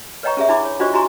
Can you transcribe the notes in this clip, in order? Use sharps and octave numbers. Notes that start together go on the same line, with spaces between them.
B4 C#5 D#5 G5 A#5 C#6
C#4 G#4 E5
D4 E4 B5 D6
C#5
D4 F4 F#4 C5 D#5 C#6
E4 F#4 G#5 A#5 C6 C#6